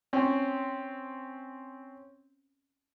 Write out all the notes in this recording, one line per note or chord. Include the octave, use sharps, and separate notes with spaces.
C4 C#4